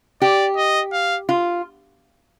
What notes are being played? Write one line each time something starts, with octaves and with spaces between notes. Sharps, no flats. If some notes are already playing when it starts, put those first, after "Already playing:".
G4 D5
D#5
F5
F4